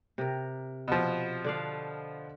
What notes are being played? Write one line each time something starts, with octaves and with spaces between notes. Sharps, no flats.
C3 A#4
B2 F3
D3 D5 F5